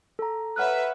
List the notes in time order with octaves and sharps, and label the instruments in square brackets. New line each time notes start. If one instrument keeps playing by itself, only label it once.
[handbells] A4 A#5
[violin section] B4 C#5 E5 [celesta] F#5 F6 F#6